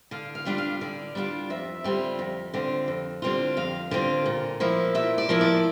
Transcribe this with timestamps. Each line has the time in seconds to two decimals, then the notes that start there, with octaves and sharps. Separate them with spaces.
0.11 D3 F5
0.35 F5
0.46 G3 D4 F4
0.58 F5
0.81 D3 D5
1.15 G3 D4 F4
1.50 F2 E5
1.84 D3 G3 C4 F4
2.19 F2
2.54 D3 G3 C4 F4
2.88 F2
3.22 D3 G3 C4 F4
3.57 F2 F5
3.91 D3 G3 C4 F4
4.26 A#2
4.60 F3 A#3 E4
4.95 A#2 E5
5.18 D5
5.29 F3 A#3 E4
5.41 D5